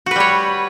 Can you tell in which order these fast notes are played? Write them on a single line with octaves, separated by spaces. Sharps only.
F#4 B4 G3 C#5